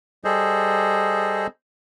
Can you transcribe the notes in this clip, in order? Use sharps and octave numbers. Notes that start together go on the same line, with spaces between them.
G3 G#4 A4 C5 D#5